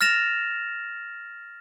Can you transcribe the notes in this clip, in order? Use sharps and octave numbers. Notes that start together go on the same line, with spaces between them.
F6 A6 A#6 E7 F7